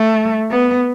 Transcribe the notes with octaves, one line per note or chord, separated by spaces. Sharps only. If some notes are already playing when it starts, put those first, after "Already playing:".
Already playing: A3
B3